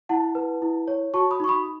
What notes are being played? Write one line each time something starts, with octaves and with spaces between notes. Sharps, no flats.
E4 F#5 A5
B4
E4
C#5
F#4 A5 C#6
B5 D#6
D#4 C#6
B5 D#6